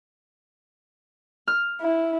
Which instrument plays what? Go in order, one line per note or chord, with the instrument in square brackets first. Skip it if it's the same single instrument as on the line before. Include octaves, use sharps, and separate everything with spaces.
[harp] F6
[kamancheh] E4